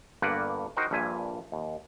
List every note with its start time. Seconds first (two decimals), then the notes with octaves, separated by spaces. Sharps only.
0.22 G1 G2 A#3 B4 D5 F#5
0.77 D#4 F#4 A#4 C5 F#5 G5
0.91 A#1 G2 A#2 E5 G#5
1.52 D#2